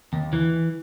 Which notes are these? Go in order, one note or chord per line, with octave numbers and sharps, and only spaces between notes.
D#2
E3